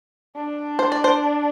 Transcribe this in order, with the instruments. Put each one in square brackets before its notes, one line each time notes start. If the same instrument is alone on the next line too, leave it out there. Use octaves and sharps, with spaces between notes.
[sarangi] D4
[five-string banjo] C5
D5
C5